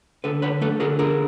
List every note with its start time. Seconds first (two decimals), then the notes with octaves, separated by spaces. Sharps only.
0.24 D3 A4 B4
0.42 D3 B4 C#5
0.61 A3 A4 B4
0.80 D3 G#4 A#4
0.99 D3 G#4 A#4